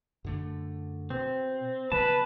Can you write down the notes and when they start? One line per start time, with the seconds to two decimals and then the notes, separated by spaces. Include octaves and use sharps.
0.24 F#2 D3 A3
1.10 B2 C4
1.92 C#3 F#3 B3 B4 A5